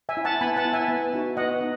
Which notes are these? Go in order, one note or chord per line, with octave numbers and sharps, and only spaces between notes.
E5 G#5
E4
F#5 A5
B3 G#5 B5
F#5 A5
E4
E5 G#5
B3
D#4 F#4
B3 D#5 F#5
D#4